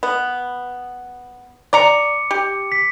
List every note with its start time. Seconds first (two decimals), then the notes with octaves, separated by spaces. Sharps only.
0.03 B3
1.73 D5 A#5 D6 C#7
2.31 G4
2.72 B6